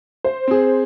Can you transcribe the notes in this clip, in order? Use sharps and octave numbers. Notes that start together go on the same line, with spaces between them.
C5
C4 G#4